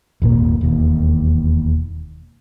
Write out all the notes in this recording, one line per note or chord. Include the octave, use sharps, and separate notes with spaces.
D#1 G#1 A#2 A#3
E1 D#2